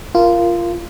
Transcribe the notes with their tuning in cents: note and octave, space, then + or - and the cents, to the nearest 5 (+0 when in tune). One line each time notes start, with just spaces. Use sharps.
F4 -15 A#4 +0